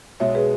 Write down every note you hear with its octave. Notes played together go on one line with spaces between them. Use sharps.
B1 B2 G#3 C#5 E5
G#4 B4